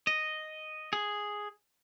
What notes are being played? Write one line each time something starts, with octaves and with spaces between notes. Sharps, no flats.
D#5
G#4